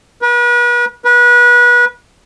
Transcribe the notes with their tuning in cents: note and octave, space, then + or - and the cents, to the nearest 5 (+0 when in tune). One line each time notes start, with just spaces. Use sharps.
B4 -40
B4 -30